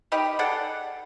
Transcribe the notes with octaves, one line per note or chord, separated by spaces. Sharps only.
D#4 G4 D#5 B5
G#4 A4 D5 F#5